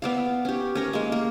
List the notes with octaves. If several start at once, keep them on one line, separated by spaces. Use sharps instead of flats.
B3 D5 F5
C#4 G4
C#4 A#4 A#5
G#3 A#3
A#3